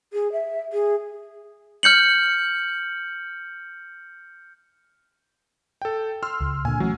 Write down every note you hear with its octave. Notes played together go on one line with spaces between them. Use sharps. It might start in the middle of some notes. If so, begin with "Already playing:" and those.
G#4
E5
G#4
F6 G6 C#7 F#7
A4 G5
C6 E6 F6
C#2
A#2 D3 G#5
E3 F#3 A3 C#4